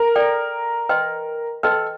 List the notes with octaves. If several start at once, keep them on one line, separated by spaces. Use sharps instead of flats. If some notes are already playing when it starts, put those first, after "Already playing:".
Already playing: A#4
A4 D5 G5
B4 D#5 G5 C6
A4 B4 D#5 G5 C6